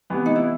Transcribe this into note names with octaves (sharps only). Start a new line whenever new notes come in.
C3 E3 B3
D#4
E4